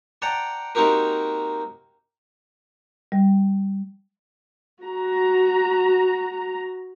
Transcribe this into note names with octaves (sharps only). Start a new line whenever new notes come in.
D5 F#5 G5 A5 A#5
A#3 C4 D#4 F#4 G4 A#4
G3
F#4 A#5